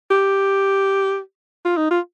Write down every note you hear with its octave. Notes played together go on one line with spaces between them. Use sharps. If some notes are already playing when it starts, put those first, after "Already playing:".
G4
F4
D#4
F4